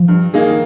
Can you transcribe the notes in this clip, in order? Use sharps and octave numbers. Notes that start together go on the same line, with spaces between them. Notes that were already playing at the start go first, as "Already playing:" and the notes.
Already playing: F3
G2
D#3 A#3 D#4 G#4